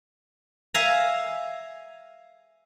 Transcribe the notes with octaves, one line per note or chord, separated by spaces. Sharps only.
E5 F5 G#5 A#5